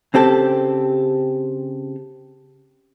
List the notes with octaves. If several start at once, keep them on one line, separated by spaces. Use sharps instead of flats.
C#3 C4 G4 A4